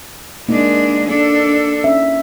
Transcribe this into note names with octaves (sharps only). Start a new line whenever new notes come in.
G#3 A#3 D4 D#4
D4 A4
C#4 E5